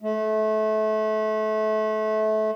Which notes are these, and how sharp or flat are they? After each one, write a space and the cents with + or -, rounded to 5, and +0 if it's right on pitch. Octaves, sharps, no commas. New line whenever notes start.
A3 -25